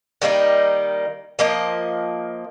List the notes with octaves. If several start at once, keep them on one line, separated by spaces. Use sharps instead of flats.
D#3 G3 A#3 D#4
F3 A#3 D#5